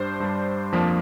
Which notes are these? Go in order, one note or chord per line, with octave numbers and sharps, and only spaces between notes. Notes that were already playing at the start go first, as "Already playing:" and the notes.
Already playing: G2 G3 D4 C5
G2 G3 D4
F2 F3 A#3 D4